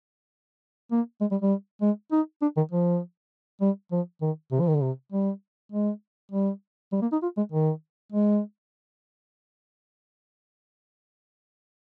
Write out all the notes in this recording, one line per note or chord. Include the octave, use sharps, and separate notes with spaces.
A#3
G#3
G3
G3
G#3
D#4
D4
D#3
F3
G3
F3
D#3
C3
F3
D#3
D3
C3
G3
G#3
G3
G3
A#3
D#4
F4
G#3
D#3
G#3